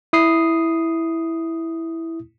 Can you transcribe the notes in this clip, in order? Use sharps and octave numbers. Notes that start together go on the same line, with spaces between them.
E4 D#6 C7